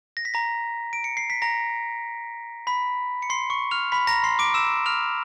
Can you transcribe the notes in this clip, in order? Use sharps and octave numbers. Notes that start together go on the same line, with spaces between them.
A#6
B6
A#5 A#6
D7
C#7
C7
B6
A#5 A#6
B5 B6
C#7
C6 C7
C#6 C#7
F6 F7
B5 B6
A#5 A#6
C6 C7
D6 D7
E6 E7
F6 F7